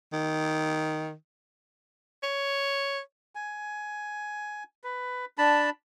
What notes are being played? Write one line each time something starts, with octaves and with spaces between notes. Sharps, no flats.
D#3
C#5
G#5
B4
D4 A5 B5